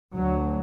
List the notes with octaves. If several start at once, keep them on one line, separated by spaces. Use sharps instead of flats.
D2 F#3